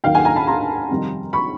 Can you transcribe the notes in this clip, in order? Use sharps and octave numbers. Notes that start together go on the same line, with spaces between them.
D#2 D#3 F#3 F5 G5
F#5 G#5
G#5 A#5
A5 B5
A#5 C6
F2 C3 D#3 G3
B5 C#6